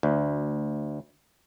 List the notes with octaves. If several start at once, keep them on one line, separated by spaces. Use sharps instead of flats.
D2